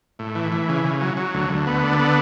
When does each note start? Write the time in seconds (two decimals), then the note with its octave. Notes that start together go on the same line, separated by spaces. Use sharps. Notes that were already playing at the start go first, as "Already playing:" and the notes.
0.19 A2
0.35 E3
0.52 E3
0.69 C#3
0.84 C#3
1.01 F#3
1.17 F#3
1.34 D2
1.50 D2
1.67 B3
1.83 D3
1.99 B3